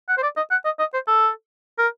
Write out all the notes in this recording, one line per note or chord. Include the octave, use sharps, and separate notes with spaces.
F#5
C5
D5
D#5
F#5
D#5
D#5
C5
A4
A#4